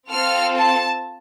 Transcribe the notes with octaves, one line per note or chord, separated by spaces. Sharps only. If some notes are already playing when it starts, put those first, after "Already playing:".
C4 F4 A4 F6
A5